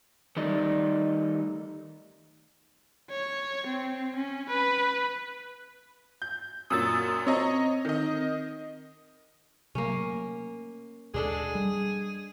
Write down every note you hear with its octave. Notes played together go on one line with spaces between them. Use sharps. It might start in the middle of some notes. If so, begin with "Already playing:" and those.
D#3 G3 A3 D#4 D5
C#5
C4
C#4
B4
G6
F#2 A#2 C#4 D#6 E6 A6
C4 C#5 D#5 A#5
D#3 D#5
C3 F#3 A3 A#3 C#4
D#2 B2 G#3 D4 G#4 A4
G3